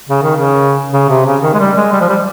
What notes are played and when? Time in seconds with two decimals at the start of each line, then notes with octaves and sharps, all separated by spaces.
0.09 C#3
0.23 D#3
0.36 C#3
0.93 C#3
1.09 C3
1.26 C#3
1.43 D#3
1.54 G#3
1.59 G3
1.76 G#3
1.93 G3
2.01 F3
2.09 G3